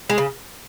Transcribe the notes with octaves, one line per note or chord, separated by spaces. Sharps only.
G#3
C#3